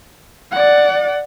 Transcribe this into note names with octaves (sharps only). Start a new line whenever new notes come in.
D5 F#5